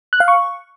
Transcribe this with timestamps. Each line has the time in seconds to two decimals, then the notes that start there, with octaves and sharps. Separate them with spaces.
0.13 F#6
0.20 F5
0.28 C#6